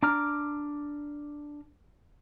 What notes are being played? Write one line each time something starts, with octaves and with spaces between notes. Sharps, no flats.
D4 A#5 D6 F6